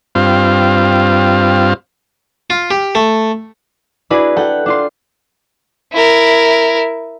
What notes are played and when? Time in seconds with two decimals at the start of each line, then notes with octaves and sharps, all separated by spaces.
0.15 G2 C4 F4
2.50 F4
2.71 G4
2.95 A3
4.10 D4 E4 F#4 G#4 B4
4.37 A4 F#5 G5 F#6 G6
4.66 D4 F4 C6
5.93 E4 A#4